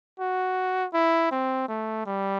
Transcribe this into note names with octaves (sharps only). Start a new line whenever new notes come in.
F#4
E4
C4
A3
G3